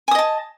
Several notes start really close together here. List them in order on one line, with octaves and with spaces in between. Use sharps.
G#5 D#6 D#5 A5